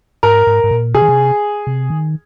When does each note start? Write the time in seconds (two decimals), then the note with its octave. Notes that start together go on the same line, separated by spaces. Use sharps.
0.23 G#2 A#4
0.47 G#2
0.64 G#2
0.71 A#2
0.94 C3 G#4
1.02 D#3
1.09 C3
1.67 C3
1.90 D#3